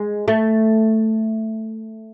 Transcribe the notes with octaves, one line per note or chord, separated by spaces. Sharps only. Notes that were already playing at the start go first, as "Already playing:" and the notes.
Already playing: G#3
A3